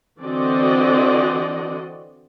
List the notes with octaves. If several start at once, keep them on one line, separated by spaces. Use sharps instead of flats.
D3 E3 C4 F#4 D5 D#5